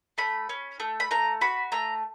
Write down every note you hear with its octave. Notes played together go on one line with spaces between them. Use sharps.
A3 B5
C#4
A3
B5
A3 A#5
F#4 B5
A3 A#5